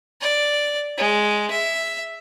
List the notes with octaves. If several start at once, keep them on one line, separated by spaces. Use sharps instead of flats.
D5
G#3
E5